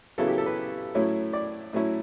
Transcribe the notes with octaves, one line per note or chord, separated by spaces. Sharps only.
C#3 F#3 B3 E4 A4
G4
A4
B4
A2 F#3 C#4 E4
D5
A2 F#3 C#4 E4